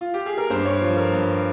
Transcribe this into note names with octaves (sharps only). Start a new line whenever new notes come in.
F4
G4
G#4
A#4
G2 C5
C#5
F3
A#4
G2